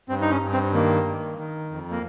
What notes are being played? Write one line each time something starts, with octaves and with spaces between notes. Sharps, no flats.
G2 C4
D#4
C#4
G2
C4
D#3 A#3
D#3
D#3
F2
A#3